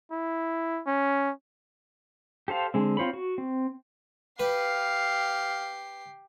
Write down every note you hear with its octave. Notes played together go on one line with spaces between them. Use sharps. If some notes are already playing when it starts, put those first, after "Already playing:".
E4
C#4
G4 A4 C5 F5
D3 G#3 C4
C4 F4 C5 C#5 B5
F#4
C4
G4 B4 F5 C7